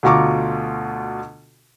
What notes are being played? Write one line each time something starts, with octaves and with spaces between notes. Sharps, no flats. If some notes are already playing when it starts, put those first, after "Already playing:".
D2 B2 F4 A#5 C#6 D6